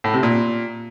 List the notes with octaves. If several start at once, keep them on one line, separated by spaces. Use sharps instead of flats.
A2
C3
A#2